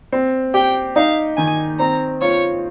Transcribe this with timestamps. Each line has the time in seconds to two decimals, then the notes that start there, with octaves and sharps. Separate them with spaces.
0.12 C4
0.54 G4 G5
0.96 D#4 F5
1.38 D#3 G#5
1.79 C4 A#5
2.21 F4 C#5